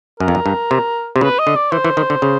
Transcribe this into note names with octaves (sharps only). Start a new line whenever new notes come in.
F#2 A#4
F2
F#2
G2
C3
C3
C#3 B4
D#5
D3
D5
E3 C5
E3
D#3
D3
C#3